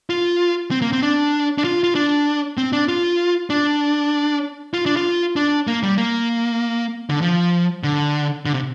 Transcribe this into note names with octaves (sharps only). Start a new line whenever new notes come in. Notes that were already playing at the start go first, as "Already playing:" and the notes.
F4
C4
A#3
C4
D4
D4
F4
F4
D4
C4
D4
F4
D4
F4
D4
F4
D4
A#3
G3
A#3
D3
F3
D3
D3
C3